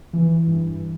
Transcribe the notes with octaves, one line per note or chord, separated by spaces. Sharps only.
E3
G2